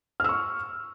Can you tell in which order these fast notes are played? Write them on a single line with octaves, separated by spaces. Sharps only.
F6 E6 C#6